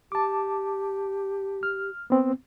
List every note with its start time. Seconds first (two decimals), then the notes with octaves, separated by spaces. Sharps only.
0.12 G4 A5 D6
1.63 F6
2.10 B3 C4